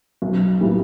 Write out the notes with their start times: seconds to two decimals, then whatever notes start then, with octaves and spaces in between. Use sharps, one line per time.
0.22 B1
0.60 A2 E3 G3 A#3